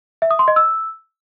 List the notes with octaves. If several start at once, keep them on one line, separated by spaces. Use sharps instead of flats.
E5
D#6
C6
D#5
E6